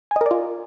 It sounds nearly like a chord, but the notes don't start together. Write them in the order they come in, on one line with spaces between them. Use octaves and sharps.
G#5 D#5 A#4 D5 F4